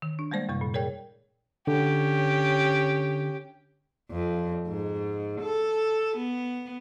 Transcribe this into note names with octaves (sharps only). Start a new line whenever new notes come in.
D#3
D4
G3 G#3 A#3 C5 D5
F#2 C3 G3 C#6
A#2
G#4 A#4 C#5 D5 G5
D3 C#4 G4
F2
G#2
A4
B3